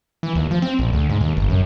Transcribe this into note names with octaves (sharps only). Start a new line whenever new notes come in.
E3
D#2
F3
C4
A#1
D2
G#2
D#2
G1
F#2